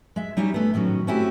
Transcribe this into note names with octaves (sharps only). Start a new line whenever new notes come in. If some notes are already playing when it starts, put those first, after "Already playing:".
G#3 E5
G3 C#4 D#4 E4 G4 C#5
G#3 A3 B3
A2 D#3 F#3 C#4
A3 C4 C#4 E4 F#4 G4